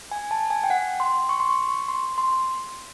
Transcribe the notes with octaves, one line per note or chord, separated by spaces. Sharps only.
G#5
A5
G#5
G5
F#5
C6
C#6
C6
C#6
C#6
C6
C6